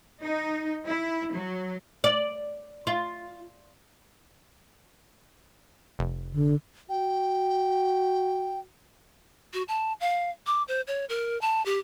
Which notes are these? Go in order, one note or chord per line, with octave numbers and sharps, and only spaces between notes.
D#4
E4
F#3
D5
F4
F1
D3
F#4 G5
F#4
A5
F5
D6
C5
C#5
A#4
A5
G4